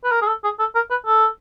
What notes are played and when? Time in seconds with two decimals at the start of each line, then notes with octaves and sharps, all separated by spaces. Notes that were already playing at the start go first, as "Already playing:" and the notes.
0.04 B4
0.12 A#4
0.22 G#4
0.27 A4
0.44 G#4
0.60 A4
0.75 A#4
0.90 B4
1.06 A4